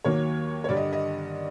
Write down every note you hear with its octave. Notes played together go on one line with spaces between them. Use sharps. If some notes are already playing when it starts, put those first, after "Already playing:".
D#2 D#3 F#3 A#3 C#5
C#5
G2 D3 G3 D5
D#5
D#5